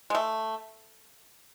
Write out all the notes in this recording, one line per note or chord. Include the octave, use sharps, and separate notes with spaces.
G#3
A3